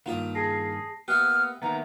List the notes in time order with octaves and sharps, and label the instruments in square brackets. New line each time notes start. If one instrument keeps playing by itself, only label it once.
[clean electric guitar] G2 D#3 [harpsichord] A#3 F4 D#5 [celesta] F7
[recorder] G#4 [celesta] A5 A#6 C7
[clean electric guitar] A#3 B3 [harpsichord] G4 E5 [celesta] D#6 F#6 [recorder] F6
[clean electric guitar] D#3 A#3 B3 [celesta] E5 [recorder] A#5